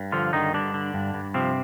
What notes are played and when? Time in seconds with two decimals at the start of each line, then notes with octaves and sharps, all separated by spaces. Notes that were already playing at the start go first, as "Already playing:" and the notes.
Already playing: G2
0.12 D3 F3 F4
0.33 G2 D#3 D#4
0.53 G2 D3 D4
0.74 D3
0.94 G2
1.14 G2
1.34 C3 F3 C4